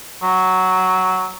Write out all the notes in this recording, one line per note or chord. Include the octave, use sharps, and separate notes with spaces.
F#3